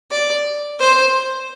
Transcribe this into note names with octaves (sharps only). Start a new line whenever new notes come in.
D5
C5